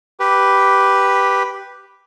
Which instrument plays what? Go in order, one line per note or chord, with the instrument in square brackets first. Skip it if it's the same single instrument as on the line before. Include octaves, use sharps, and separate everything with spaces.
[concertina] G4 B4